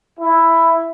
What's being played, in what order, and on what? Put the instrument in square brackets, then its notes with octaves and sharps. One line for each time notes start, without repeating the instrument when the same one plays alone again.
[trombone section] E4